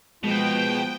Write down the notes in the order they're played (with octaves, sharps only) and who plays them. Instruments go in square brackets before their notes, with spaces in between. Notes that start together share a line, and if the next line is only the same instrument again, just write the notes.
[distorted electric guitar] B2 [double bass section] F3 B3 [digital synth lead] G#3 [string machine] G5